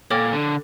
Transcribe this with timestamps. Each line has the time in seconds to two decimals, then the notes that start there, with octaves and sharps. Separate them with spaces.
0.10 A#2 A4 C#5 G5 D6 F6
0.33 D3